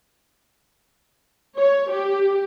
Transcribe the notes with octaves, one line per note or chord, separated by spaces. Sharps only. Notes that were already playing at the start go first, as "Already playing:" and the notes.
C#5
G4